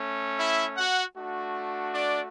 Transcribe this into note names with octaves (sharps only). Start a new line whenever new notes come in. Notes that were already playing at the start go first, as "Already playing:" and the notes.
Already playing: A3 C#4
E4 E5
F#4 F#5
A3 D4 F#4
D4 D5